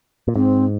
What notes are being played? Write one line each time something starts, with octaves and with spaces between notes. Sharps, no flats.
A#2
G#2 C4